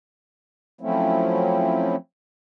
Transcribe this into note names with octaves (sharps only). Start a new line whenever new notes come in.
F3 F#3 A3 C4 C#4 E4